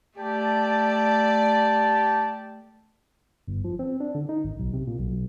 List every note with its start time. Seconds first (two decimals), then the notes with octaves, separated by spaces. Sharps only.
0.18 A3 G4 D5 A5
3.47 G1
3.64 F3
3.79 C4
4.00 D4
4.15 D3
4.29 D#4
4.44 G#1
4.59 B1
4.74 C3
4.87 A#2
4.99 B1
5.12 B1